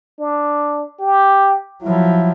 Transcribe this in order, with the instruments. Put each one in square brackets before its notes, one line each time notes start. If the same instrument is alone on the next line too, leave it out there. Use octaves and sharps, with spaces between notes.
[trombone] D4
G4
[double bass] F3 F#3 [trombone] E4